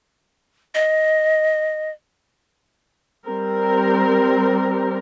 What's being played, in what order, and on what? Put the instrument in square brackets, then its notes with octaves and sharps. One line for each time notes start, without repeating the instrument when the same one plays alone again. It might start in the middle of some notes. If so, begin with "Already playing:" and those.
[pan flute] D#5
[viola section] G3 C4 A#4